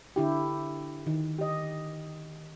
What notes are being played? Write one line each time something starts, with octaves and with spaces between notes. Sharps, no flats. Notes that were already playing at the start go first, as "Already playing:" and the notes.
D3 E4 G4
D#3
G4 D#5